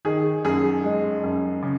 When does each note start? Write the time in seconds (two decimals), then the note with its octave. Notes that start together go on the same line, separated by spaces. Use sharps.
0.05 D#3 G#4
0.44 F#2 G#4
0.84 G#3
1.24 F#2
1.63 C#3